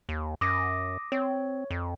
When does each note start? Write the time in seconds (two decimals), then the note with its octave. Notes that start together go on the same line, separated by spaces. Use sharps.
0.09 D#2
0.41 F#2 D6 D#6 A#6
1.12 C4 C#5
1.70 F2